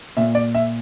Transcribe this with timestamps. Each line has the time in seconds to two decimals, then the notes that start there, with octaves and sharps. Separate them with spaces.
0.17 A#2 E5
0.35 D5
0.54 E5